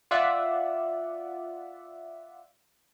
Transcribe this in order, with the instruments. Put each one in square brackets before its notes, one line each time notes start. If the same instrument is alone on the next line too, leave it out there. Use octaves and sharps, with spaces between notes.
[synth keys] F4 D5 E5 F#5